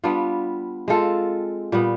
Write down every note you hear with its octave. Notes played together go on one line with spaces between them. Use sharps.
G3 B3 D4 F4
G#3 C4 F4 A4
A#2 G3 B3